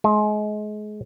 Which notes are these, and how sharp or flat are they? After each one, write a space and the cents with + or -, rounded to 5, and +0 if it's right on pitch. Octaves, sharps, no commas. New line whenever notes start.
G#3 +30